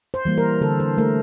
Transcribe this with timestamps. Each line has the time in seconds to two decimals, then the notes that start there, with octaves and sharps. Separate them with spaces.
0.14 C5
0.25 E3 G3 A#3
0.38 A#4
0.61 D3 A4
0.80 C5
0.98 A3 A#4